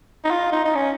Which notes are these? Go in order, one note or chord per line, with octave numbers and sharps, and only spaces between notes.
D#4
F4
D#4
D#4
C#4